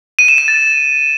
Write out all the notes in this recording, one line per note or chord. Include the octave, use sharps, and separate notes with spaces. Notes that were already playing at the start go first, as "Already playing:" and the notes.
D#7
E7
D#7
A6